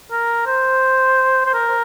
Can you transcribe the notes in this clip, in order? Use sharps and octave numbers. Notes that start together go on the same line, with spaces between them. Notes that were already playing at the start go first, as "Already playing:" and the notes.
A#4
C5
C5
A#4